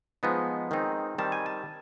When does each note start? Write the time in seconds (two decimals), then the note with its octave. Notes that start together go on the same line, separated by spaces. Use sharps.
0.23 F3 G#3 B3 D#4
0.71 D#3 G#3 C4 D#4
1.18 D#3 G3 C4 A5
1.32 G#5
1.46 A5